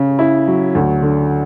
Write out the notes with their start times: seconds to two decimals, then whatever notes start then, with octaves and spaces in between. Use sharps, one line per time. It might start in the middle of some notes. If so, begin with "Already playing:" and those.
Already playing: C#3
0.19 E4
0.47 F#3
0.75 D2
1.02 D3